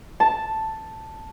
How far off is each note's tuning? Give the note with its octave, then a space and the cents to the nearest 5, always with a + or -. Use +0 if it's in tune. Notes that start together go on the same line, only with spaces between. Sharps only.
A5 +0